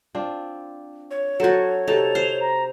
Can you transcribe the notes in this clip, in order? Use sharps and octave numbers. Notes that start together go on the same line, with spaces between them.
C4 D4 F4
C#5
F#3 F#4 A4 C5
C3 D#4 A4 F7
C5
A#5